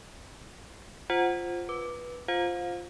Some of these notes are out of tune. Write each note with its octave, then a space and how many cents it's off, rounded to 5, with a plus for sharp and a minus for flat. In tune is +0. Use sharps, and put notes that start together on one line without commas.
F4 +0 C5 +0 F#5 +0
B4 -15 D6 +0
F4 +0 C5 +0 F5 +35